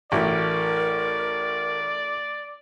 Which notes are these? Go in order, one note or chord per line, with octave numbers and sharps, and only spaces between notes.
A1 E3 A3 E4 F#4 A#4 D5